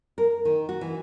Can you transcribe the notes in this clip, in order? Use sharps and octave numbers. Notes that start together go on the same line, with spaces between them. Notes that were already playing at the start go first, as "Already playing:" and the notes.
A#4
D#3
F#4
E3